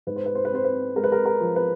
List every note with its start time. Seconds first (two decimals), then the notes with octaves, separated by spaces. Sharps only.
0.07 G#2 B4
0.16 C5
0.26 B4
0.35 C5
0.45 B4
0.52 C4 C5
0.64 B4
0.96 G#3 A#4
1.04 B4
1.12 A#4
1.25 A#4
1.41 F3
1.56 B4